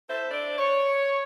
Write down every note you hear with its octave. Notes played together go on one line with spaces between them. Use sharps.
E4 A4 C5 E5
D4 C5 D5
C#5